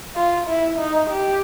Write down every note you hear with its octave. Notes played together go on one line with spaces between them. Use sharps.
F4
E4
D#4
G4